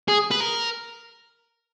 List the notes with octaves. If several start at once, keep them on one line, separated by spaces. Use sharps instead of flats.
G#4
B4
A#4